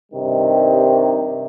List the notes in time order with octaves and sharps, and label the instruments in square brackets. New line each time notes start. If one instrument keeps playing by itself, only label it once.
[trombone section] G2 C3 D#3 G3 D#4